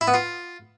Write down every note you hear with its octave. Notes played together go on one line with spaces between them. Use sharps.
E4
B3
F4